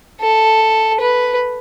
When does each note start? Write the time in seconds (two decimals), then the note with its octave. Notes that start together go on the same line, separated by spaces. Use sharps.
0.21 A4
1.00 B4